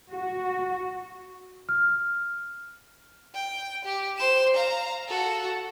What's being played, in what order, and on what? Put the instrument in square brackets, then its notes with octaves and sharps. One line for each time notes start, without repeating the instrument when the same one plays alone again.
[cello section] F#4
[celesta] F6
[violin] G5
G4
C5 E7
F5 A#5
F#4 A4